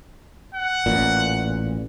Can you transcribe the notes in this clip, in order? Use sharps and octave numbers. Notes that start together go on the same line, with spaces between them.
F#5
A1 A#2